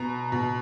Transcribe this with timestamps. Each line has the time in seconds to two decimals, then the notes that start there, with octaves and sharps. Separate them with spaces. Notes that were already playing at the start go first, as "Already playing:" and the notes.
Already playing: B2 A#5
0.32 B2